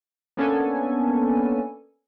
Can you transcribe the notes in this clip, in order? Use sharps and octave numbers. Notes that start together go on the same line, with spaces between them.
A#3 B3 C#4 D4 A4 G#5